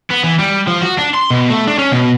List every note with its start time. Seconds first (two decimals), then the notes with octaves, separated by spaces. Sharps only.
0.11 B3
0.24 E3
0.39 G3
0.68 F3
0.82 F#4
0.98 D4
1.14 C6
1.30 B2
1.50 A3
1.68 D4
1.79 C#4
1.92 B2